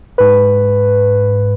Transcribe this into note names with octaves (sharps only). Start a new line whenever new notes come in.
G#2 B4